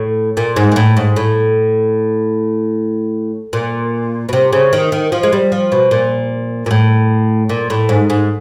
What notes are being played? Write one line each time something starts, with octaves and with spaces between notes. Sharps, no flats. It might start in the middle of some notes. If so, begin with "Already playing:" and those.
Already playing: A2
A#2
G#2
A#2
A2
G#2
A2
A#2
B2
C3
C#3
D#3
D#3
F3
G#3
G3
F3
B2
A#2
A#2
A2
A#2
A2
G#2
G#2